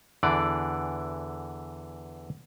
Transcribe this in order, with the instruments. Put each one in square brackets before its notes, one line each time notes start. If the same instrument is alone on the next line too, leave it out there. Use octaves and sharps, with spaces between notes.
[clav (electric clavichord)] E2 D3 E3 D5